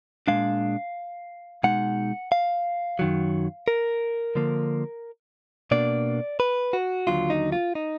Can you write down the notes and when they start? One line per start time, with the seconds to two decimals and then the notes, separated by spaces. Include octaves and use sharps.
0.28 A#2 G#3 D4 F5
1.63 B2 G#3 D#4 F#5
2.32 F5
2.99 F#2 D#3 F#3
3.68 A#4
4.35 D3 F3 A#3
5.71 B2 A#3 D4 D5
6.40 B4
6.73 F#4
7.07 D#2 D3 F#3 F4
7.30 D#4
7.52 F4
7.75 D#4